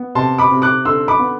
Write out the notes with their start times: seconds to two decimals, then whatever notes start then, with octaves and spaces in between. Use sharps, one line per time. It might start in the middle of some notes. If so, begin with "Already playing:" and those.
Already playing: B3
0.15 C3 A5 C6
0.38 B5 D6
0.51 C3
0.62 D6 F#6
0.85 D3 C6 E6
1.08 B5 D6
1.20 B3